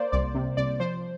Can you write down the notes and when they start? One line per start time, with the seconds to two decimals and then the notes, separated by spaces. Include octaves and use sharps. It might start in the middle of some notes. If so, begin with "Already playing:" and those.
Already playing: A#3 C5 D5
0.12 C2 D5
0.35 C3
0.57 C2 D5
0.80 F3 C5